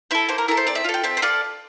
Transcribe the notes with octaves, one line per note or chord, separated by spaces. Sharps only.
E4 A4 C5
A#3 C5
A#4
E4 A4 A#4
C5
C4 D5
E5
F4 A4 F5
G5
C4 E5
C5
F4 A4 D5